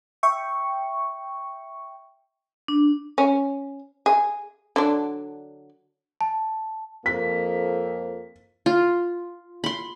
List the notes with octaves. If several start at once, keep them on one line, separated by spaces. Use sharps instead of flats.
E5 G5 C#6
D4
C#4
G#4
D3 F#3 D4
A5
F2 A#3 B6
F4
B5 C6